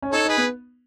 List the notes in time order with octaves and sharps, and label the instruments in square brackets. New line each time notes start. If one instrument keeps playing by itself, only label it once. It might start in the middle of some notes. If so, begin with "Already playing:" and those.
[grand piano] C#4
[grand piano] D#4 [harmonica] A4 C#5
[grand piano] D#4 [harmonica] G#4 B4
[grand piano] B3